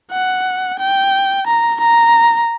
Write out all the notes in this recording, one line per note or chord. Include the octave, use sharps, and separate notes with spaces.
F#5
G5
A#5
A#5